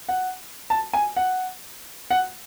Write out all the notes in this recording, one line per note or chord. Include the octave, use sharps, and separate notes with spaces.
F#5
A5
G#5
F#5
F#5